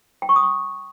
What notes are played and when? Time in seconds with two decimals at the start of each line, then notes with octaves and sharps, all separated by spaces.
0.22 G5
0.29 C#6
0.36 D#6
0.43 C#6